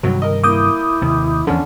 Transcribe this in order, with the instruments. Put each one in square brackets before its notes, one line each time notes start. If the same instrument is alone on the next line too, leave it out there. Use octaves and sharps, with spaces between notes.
[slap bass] G2 C3 D#3 [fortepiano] F#3
[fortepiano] A#4 D#5
[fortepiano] A#3 [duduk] E4 [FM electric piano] D6 D#6 G6
[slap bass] D#2 C3
[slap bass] E2 F3 [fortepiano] D3 [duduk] C#4